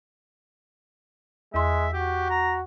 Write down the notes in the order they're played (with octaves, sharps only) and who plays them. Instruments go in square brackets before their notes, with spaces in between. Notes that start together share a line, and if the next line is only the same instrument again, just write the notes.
[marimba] E2 C6 [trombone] G#3 [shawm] E5
[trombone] F#4 [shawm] G4
[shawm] A#5